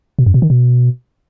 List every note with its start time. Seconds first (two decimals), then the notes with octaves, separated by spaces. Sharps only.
0.19 B2
0.26 F#2
0.34 B2
0.42 D#3
0.50 B2